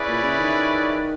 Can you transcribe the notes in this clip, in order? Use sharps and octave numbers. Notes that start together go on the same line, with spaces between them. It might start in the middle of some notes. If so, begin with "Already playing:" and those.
Already playing: C#4 E4 G#4 B4 D5
A#2
C#3
D#3